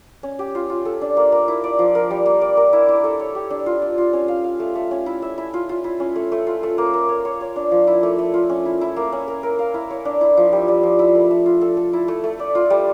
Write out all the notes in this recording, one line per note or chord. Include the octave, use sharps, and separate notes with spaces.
C#4
G4
F4
F4
A4
D4
A#3
A#3
E4
D5
F3
A#4
G3
A#3
D5
A#4
E4
E4
A4
C#5
G4
D4
F4
D4
F4
C#4
F5
F5
A3
A3
C#4
E4
E5
E4
F4
F4
E4
C#4
A3
A3
F4
A3
A#3
A#3
C#5
C#5
C#5
D4
F3
E4
A3
A3
F4
C#4
E4
E4
A#3
C#4
A#4
A#4
F5
E4
C#5
D4
E4
F3
G3
G3
F3
E4
A3
A3
F4
A4
A4
E4
A3
A3
D5
F4
G3